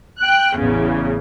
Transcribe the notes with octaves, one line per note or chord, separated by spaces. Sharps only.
G5 F#6
A1 E2 C#3